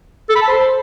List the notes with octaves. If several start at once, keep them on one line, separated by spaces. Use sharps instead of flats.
A4
B5
A5
C5